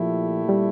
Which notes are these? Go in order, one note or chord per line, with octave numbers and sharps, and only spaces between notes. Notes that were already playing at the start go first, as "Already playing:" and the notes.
Already playing: A#2 F3 A3 E4 G4
G3